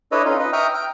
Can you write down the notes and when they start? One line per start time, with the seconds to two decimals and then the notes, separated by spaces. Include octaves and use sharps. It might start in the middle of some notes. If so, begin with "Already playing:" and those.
0.12 D4 E4 A4 B4 C#5 D#5
0.25 C#4 D#4 F4
0.39 B4 D#5
0.53 E5 G5 A#5 C#6 D#6 F6
0.74 G5 A#5 F6